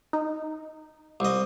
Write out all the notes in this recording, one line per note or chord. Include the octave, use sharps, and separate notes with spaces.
D#4
C2 D#5